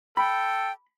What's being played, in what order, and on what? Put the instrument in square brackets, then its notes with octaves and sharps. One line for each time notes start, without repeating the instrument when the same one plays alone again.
[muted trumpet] A4 [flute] G5 [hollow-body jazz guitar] B5